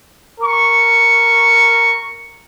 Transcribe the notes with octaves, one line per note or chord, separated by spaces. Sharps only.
A#4 C#6